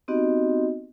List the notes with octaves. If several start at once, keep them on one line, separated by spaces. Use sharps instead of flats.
B3 C4 D#4 F#4 G4 D#5